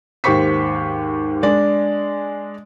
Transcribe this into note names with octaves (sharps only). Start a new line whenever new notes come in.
D#2 G#2 G4 C5 C#6 B6
G#3 D4 D5